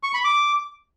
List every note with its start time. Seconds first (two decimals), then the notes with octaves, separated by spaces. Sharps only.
0.03 C#6
0.14 B5
0.25 D6